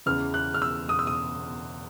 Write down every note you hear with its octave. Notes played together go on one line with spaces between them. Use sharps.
E2 C#3 E3 F6
F#6
F6
E6
D#6
E6
D#6